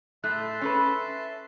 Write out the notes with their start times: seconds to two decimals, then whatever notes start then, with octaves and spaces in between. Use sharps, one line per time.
0.24 A2 A3 E5 A5 C6 F#6
0.61 C#4 A4 B4